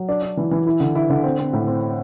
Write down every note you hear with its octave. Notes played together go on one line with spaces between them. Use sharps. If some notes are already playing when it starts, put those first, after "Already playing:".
Already playing: F#3
D4
D4
E3
E3
E4
D3
E4
D3
C4
C4
A2
C4